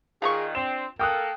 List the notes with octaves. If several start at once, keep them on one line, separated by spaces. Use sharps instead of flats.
A#2 D#3 F4 G#4 A#5 C#6
C4 D4 E7
A#3 A4 A#4 G5 D#6 F#6